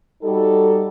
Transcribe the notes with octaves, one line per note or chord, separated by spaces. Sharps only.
G3 D#4 F#4 A4